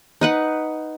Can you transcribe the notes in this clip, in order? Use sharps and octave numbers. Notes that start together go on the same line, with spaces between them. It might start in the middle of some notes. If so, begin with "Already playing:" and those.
D#4 B4 F#5